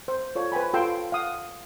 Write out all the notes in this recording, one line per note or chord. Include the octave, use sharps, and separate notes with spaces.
C5
F4 A4 C#5 D5
B4 C5 G5 G#5 B5
F4 A4 C#5 G5 C6 E6
F5 F#5 D#6